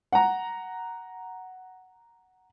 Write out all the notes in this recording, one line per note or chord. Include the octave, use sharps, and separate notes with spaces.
F#5 A#5